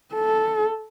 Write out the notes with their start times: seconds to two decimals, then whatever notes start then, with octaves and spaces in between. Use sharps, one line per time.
0.14 A4